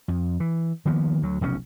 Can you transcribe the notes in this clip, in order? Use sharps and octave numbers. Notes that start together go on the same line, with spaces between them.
F2
E3
D#3 F3 A#3 B3
D2 F#3
F1 B1 A2 C#4